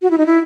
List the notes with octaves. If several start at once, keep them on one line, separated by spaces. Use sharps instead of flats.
F#4
E4
D#4
E4